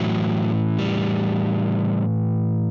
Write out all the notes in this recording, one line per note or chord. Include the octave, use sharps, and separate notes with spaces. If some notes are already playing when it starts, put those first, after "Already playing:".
Already playing: A2 E3 F#3
G3